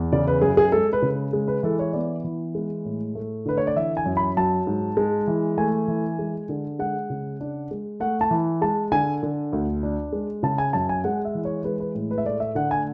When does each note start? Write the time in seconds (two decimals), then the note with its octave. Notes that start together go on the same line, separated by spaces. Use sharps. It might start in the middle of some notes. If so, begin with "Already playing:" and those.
Already playing: E2
0.12 C#3 D5
0.27 B4
0.42 F#2 G#4
0.57 G#4
0.72 G#3 A4
0.93 B4
1.02 C#3
1.33 G#3
1.48 B4
1.63 E3 A4
1.79 C#5
1.93 B3 D5
2.24 E3
2.55 G#3
2.85 A2
3.15 A3
3.46 D3 B4
3.57 C#5
3.67 D5
3.76 E3 E5
3.97 G#5
4.06 F#2
4.17 B5
4.37 F#3 A5
4.67 G#2
4.97 G#3
5.27 E3
5.58 A3 G#5
5.88 E3
6.19 G#3
6.49 D3
6.79 G#3 F#5
7.10 C#3
7.40 D4
7.71 G#3
8.00 A3 F#5
8.21 A5
8.31 E3
8.61 G#3 A5
8.92 D3 G#5
9.23 D3
9.53 D2
9.83 D4
10.13 G#3
10.43 C#3 A5
10.58 G#5
10.73 F#2 A5
10.89 G#5
11.04 G#3 F#5
11.25 E5
11.35 E3
11.45 C#5
11.64 G#3 B4
11.80 B4
11.95 A2
12.11 B4
12.18 E5
12.25 A3 D5
12.40 E5
12.55 D3 F#5
12.71 G#5